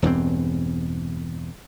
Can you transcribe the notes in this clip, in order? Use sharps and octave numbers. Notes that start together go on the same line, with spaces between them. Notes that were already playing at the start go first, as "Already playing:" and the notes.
E1 E2 G2 C4